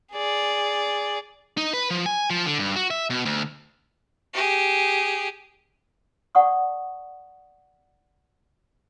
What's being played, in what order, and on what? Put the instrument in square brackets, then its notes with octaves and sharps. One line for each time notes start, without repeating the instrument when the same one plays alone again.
[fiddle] G#4 D5
[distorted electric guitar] D#4
B4
F3
G#5
F3
D3
G2
F#4
E5
B2
D2
[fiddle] G4 G#4
[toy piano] D5 F#5 A5 C#6 D#6